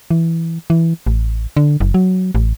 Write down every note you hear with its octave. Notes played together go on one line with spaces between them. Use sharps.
E3
E3
A1
D3
F#1
F#3
A1